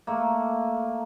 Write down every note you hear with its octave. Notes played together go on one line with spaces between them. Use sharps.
A3 A#3